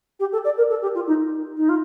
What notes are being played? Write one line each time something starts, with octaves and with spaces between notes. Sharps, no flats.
G4
A4
D5
A#4
A4
G4
F4
D#4
D#4
F4